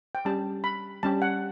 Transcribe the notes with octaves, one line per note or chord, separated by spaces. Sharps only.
G5
G3 C#4 G4 A5
B5
G3 C#4 G4 A5
F#5